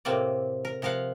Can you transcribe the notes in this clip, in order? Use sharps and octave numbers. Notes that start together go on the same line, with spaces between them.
A2 C3 A#3 C4 D5
A#4
C3 F3 A#4 F5 F#5